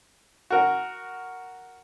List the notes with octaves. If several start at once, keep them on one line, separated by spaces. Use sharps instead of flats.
F#4 A#4